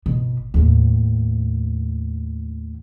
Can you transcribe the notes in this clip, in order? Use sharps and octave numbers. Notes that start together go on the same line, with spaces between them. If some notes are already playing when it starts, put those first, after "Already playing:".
G1 B2
D#2 A2